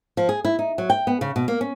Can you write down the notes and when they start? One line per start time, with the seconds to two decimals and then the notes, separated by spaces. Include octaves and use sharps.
0.17 F3
0.29 G#4
0.45 E4
0.59 D#4
0.78 F#3
0.90 G5
1.07 B3
1.21 C#3
1.36 B2
1.48 A#3
1.61 C#4